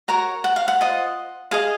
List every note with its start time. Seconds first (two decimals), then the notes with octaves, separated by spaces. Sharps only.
0.08 F#4 A#4 C#5 A#5
0.44 F#5
0.56 F5
0.68 F#5
0.81 F4 C5 D#5
1.51 G#4 D#5 F5